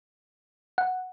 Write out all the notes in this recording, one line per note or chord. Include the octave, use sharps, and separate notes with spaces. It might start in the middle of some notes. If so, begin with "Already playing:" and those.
F#5